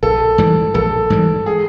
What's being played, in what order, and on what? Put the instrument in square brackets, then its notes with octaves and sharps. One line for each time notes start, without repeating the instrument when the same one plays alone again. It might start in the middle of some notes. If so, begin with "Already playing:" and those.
[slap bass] A#1 [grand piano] A4
[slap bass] G#2 E3 G3
[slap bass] A#1 [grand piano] A4
[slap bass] G#2 E3 G3
[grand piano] G#4